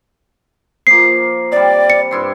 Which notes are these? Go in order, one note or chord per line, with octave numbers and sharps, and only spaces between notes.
F3 A#3 C7
C3 G3 D5
C#7
G2 E4 C6